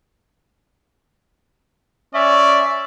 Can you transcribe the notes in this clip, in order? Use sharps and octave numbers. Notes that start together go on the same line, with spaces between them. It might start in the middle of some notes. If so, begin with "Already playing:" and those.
C#4 D5 E5